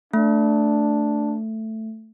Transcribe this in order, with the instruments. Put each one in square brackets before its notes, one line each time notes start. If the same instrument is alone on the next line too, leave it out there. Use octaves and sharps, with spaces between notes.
[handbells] A3 [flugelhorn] D4